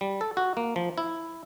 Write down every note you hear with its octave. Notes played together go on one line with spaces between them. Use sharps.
G3
A4
F#4
A#3
F3
E4